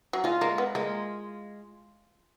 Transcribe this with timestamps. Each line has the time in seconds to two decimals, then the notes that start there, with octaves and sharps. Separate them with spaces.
0.13 F#3
0.24 G#3 F4
0.41 G#3 A#3
0.58 B3
0.75 G#3 A#3